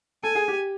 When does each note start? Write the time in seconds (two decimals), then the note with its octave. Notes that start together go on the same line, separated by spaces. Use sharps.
0.23 A4 G#5
0.35 G#4
0.48 G4